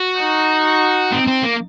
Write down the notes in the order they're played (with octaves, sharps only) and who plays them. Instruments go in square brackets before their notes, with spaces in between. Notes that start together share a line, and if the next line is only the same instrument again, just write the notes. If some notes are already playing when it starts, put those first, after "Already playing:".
Already playing: [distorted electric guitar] F#4
[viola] D#4
[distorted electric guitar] C4
C4
A#3